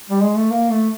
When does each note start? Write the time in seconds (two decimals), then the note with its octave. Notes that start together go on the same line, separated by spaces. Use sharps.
0.10 G3
0.23 G#3
0.37 A3
0.50 A#3
0.70 A3